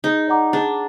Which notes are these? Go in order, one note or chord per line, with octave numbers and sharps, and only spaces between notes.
D#4 G#4
D5 F#5 A#5 D6
D4 G#4